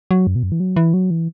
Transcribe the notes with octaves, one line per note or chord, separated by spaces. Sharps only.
F#3
F#2
B2
F#2
E3
F#3
E3
F#3
E3